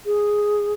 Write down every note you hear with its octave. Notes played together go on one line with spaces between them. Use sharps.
G#4